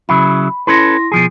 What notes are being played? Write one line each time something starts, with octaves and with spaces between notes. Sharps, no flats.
C#3 F#3 E4 B5
C#4 E4 A4 B4 C6 A#6
B2 F3 G#4